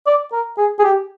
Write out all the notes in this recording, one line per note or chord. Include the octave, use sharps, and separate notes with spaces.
D5
A#4
G#4
G#4
G4